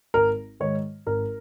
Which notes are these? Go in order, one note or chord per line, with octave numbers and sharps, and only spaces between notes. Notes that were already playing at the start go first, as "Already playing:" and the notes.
G#1 A#4
G#2 D#3 C#5
G#1 A#4